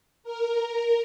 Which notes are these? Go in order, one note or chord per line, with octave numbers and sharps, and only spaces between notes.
A#4